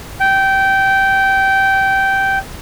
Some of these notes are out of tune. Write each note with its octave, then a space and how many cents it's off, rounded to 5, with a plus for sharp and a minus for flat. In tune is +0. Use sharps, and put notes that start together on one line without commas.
G5 -15